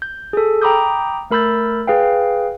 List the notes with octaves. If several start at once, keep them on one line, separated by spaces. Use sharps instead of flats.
G6
G#4 A4
G5 A#5 B5 D6 D#6 G6
A3 A#4 B5 E6 G6 A6
G#4 B4 F5 G5